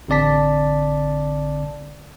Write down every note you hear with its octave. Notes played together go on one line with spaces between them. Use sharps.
A1 D3 C4 D5 A5 B6